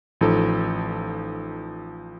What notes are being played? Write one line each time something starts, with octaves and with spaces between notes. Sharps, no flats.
A1 F3 D#4 A4